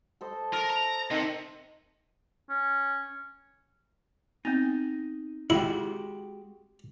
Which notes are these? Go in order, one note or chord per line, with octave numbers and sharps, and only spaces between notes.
A4 C5 D#5
A4 A#4
A#5
C3 D#3
C#4
B3 C4 D#4
G#3 E4 F#4 G4